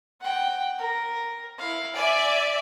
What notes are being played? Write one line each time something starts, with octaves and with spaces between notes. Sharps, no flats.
F#5 G5
A#4
E4 F5
D5 E5 G#5